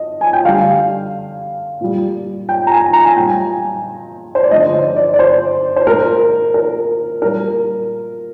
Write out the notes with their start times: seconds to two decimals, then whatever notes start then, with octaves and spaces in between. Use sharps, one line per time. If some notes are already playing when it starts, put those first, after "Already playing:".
Already playing: D#5
0.21 G#5
0.33 G5
0.45 D3 G3 F5
1.81 A#2 G3
2.49 G5
2.67 A#5
2.71 G#5
2.93 A#5
3.05 G#5
3.16 A#2 G3 G5
3.27 G#5
4.35 C5
4.43 D5
4.51 D3 F3 G#3 D#5
4.74 C5
4.96 D5
5.14 D5
5.19 C5
5.76 C5
5.87 A#2 G#3 A#4
6.54 A#4
7.22 A#2 G3 A#4